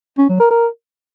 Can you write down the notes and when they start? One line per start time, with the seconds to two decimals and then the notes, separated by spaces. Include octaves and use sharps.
0.18 C#4
0.29 F#3
0.40 A#4
0.51 A#4